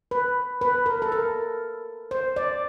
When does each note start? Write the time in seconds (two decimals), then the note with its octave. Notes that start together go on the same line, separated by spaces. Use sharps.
0.11 B4
0.61 B4
0.86 A#4
1.02 A4
1.12 A#4
2.11 C5
2.36 D5